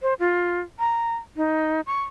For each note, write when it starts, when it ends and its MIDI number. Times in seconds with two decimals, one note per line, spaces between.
0.02 0.14 72
0.19 0.60 65
0.79 1.15 82
1.36 1.81 63
1.86 2.01 85